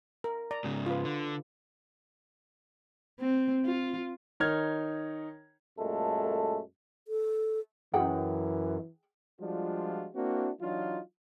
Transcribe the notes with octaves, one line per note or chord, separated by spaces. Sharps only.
A#4
D5 A#5
G#2 C#3
F4 B4
D3
C4
F4
D#3 D#4 C#5 F6 G#6
F#2 A#2 G#3 A3 A4
A4
F#2 E3 G#4 F#5 G5
F3 G3 G#3 D4 F4 F#4
A#3 C4 D4 E4 F#4
E3 F#3 D4 D#4 F4